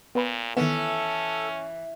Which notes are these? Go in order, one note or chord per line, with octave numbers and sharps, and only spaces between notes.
A#2 B3 B4 B5
D#3 E3 B3 C#4 A4